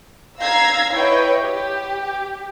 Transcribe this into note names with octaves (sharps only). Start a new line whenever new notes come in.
F5 A#5 E6 G#6 A#6 C7
E4 B4 C#5 D#5 G5
G4